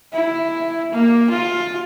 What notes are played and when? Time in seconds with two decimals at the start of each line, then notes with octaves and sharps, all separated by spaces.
0.13 E4
0.92 A#3
1.31 F4